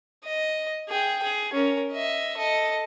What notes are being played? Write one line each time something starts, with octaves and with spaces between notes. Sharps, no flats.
D#5
G#4 G5
G#4
C#4 A#4
D#5 E5
A4 D#5